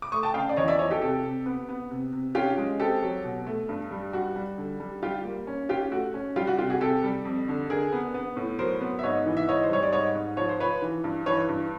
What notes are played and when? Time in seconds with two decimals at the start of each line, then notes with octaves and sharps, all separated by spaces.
0.02 D6
0.12 A3 C#6 D#6
0.23 G5 A5
0.34 C#3 F5 G5
0.49 D5
0.56 E2 C#5 D#5
0.68 D5 E5
0.79 F3 C#5 D#5
0.91 G4 A4
1.01 C3 G4 A4
1.23 C3
1.46 B3
1.69 B3
1.91 C3
2.13 C3
2.35 C#4 F4 G4
2.58 G#3
2.80 C4 G4 A4
3.02 F#3
3.24 B2
3.47 A3
3.69 G2
3.91 G3
4.13 G3 F#4
4.36 G3
4.58 D3
4.80 G3
5.02 G3 F4 G4
5.25 A#3
5.47 C#4
5.69 C#4 F4 G4
5.92 A3 F#4
6.14 C#4
6.36 G3 F4 G4
6.47 F#4
6.58 C3 F4 G4
6.70 F#4 G#4
6.81 C3 G4 A4
7.03 G3
7.25 F2
7.48 D3
7.70 D3 G#4 A#4
7.92 B3
8.14 B3
8.37 A2
8.59 F#3 A#4 C5
8.81 B3
8.99 E5
9.03 G#2 C#5 D#5
9.26 E3
9.37 E5
9.48 G#2 C#5 D#5
9.63 C5
9.70 G3 C#5
9.83 D5
9.92 G#2 C#5 D#5
10.15 G#2
10.37 F3 C#5
10.49 C5
10.60 F3 B4 C#5
10.82 E3
11.04 G2
11.26 E3 B4 C#5
11.48 G2